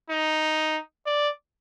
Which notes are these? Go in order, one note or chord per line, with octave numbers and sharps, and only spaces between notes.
D#4
D5